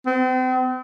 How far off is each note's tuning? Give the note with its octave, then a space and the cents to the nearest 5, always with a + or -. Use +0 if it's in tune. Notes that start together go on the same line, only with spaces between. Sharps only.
C4 -40